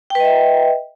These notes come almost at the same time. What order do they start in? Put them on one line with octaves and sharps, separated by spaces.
G5 B4 D#5 E5